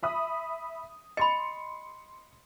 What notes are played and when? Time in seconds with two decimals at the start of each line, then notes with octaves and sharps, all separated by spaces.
0.03 E5 B5 D#6
1.17 D#5 B5 C6 C#7